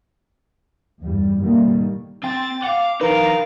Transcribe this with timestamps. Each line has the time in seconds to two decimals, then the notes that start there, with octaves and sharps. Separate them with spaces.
1.02 E2 G2 G3
1.39 G#2 B2 D3 D#3 G3 A#3
2.24 C4 G5 A6
2.64 F5 F#5 D6
3.01 E3 D#4 A#4 B4 F5